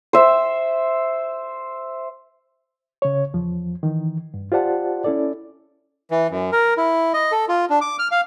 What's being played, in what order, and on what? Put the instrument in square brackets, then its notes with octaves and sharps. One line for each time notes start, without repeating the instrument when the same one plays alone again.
[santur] C5 E5
[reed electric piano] C#3 C#5
E2 F3
D#3 E3
G2
F4 G4 C5 D5 F#5 A5
C#4 E4 A4 D5
[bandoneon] E3
F#2
A#4
E4
D#5
A4
F4
D4
D6
F6
F5